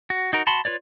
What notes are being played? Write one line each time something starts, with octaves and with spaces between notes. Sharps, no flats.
F#4
D#4 F#4 A#4
F#4 A5 B5 C6
F4 B4 C#5 D5